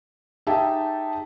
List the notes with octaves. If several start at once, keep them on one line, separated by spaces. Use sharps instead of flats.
D#4 G4 G#4 E5 G5 A5